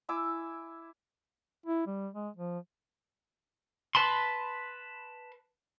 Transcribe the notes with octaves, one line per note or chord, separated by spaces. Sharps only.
E4 G#5 D6 E6
E4
G3
G#3
F3
B4 A5 B5 C6